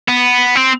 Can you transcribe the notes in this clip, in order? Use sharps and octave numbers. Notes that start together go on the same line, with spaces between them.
B3
C4